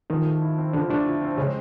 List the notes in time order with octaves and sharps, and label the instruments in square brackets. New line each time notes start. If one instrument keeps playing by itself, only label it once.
[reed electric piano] D#3 D#4 [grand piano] F3
[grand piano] A3
E4
C4
[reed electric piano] D3 D4 [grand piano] F3
[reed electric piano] D3 D4 [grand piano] A3
[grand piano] E4
C4
[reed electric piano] C#3 C#4 [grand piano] G#3